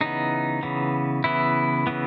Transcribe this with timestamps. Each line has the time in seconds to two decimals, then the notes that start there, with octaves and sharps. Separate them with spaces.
0.01 C#3 E3 B3 D#4
0.63 C#3 E3 B3
1.24 C#3 E3 B3 E4
1.87 C#3 E3 B3